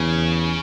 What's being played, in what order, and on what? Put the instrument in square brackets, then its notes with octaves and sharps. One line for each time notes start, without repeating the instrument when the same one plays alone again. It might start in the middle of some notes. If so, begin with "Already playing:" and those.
Already playing: [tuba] E2 [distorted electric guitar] C#3